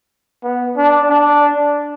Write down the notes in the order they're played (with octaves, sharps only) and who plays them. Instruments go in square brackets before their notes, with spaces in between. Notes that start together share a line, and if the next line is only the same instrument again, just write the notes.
[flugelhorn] B3
D4
D4